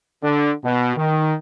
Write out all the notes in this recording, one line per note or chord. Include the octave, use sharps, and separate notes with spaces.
D3
B2
D#3